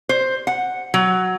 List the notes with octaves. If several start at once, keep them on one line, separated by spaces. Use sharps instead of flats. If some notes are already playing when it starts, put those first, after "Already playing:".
C5
F#5
F#3